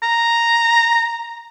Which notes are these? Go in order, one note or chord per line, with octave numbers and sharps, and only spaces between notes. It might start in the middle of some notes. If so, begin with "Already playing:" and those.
A#5